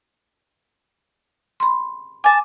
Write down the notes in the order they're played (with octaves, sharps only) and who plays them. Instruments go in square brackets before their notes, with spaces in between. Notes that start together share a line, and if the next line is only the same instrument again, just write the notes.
[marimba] B5 C6
[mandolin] G#5 A5 [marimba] D6